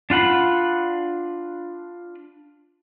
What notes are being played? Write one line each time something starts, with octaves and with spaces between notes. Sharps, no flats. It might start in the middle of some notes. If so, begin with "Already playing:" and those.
D4 F4 F#5 B5